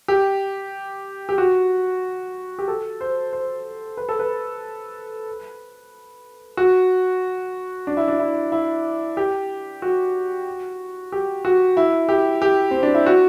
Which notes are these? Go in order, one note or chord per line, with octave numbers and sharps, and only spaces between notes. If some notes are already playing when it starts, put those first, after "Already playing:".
G4
G4
F#4
G4
A4
C5
C5
B4
A4
B4
F#4
D4
E4
D4
E4
E4
G4
F#4
G4
F#4
E4
G4
G4
C4
D4
E4
F#4